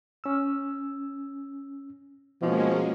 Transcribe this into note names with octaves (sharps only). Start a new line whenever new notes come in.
C#4 E6
B2 F3 G#3 A#3 C#4